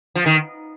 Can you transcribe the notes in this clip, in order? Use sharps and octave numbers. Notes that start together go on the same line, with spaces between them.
F3
D#3